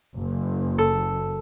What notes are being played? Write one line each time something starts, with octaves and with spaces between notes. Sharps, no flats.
F#1
A4 E6